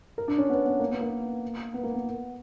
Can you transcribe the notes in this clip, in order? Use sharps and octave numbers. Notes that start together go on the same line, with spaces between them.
A#4
D4
C#4
B3
B3
A#3
B3
A#3
B3
A#3
B3